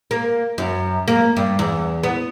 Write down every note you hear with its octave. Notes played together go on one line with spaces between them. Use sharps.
A#3
F#2
A#3
G2
E2
B3